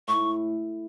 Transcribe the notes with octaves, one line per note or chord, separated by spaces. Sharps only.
A2 C#6